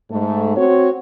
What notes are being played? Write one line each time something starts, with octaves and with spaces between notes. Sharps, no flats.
G#2 A3
C4 F#4 C#5